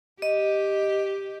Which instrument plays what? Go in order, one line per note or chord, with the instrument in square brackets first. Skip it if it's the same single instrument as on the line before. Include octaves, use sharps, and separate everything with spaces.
[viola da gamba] G4 [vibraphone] D#5